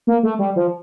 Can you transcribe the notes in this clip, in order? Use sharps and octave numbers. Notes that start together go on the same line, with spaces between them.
A#3
A3
G3
F3